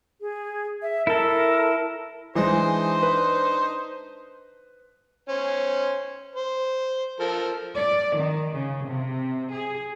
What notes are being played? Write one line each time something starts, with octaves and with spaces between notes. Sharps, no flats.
G#4
E5
E4 A4 A#4
E3 G#3 D4 D#4 C5
B4
C#4 C5
C5
F3 A4 A#4
D5
D#3
C#3
C3
G#4